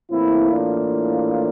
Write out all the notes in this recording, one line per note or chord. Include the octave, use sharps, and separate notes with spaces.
A2 E3 A#3 C4 E4
D4 F4